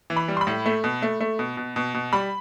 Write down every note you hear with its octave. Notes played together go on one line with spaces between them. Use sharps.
E3
B5
G3
C6
B5
A2
A3
B2
A3
A3
B2
B2
B2
B2
G3 B5